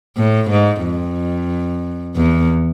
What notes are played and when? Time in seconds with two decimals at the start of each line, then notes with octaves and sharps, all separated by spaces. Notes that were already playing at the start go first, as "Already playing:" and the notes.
0.17 A2
0.50 G#2
0.83 F2
2.16 E2